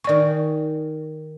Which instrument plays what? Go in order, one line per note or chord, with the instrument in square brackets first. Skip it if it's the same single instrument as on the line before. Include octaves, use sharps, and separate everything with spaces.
[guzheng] D#3 G#5 [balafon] D5 C#6